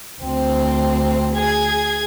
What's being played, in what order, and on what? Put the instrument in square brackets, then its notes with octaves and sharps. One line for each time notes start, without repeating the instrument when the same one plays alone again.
[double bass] D2 [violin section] C4
[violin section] G#4 G#6